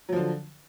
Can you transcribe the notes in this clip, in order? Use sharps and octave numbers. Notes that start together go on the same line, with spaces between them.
D3 F3 F#3